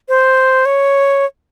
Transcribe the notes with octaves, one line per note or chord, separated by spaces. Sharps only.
C5
C#5